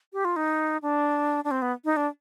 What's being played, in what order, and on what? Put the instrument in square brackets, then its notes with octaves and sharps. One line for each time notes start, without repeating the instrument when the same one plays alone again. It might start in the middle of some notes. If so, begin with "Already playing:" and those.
[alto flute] G4
F4
D#4
D4
D4
C4
B3
D#4
D4